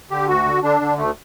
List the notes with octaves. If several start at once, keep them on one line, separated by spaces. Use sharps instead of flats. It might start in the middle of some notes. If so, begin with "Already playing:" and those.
D3 G4
D2 F#4
D3
D3 D4
D3
D2 A3